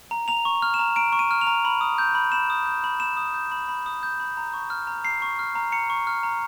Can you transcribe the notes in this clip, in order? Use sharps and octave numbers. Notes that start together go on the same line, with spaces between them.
A#5
A#5 F7
C#6
F6
E7
A#5
A#5 D7
C#6
D#7
F6
F7
A#5
B5
D#6
G6
B5
B5 E7
D#6
G6
B5
B5 E7
D#6
G6
B5
B5
D#6
G6
B5
A#5
C#6
F6
A#5
A#5 C7
C#6
F6
A#5
A#5 C#7
C#6
F6
A#5